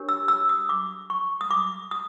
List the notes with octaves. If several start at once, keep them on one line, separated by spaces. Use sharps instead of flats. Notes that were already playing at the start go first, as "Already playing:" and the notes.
Already playing: D4 G4 A#4 C#5
E6
E6
D#6
D6
C#6
D#6
D6
D#6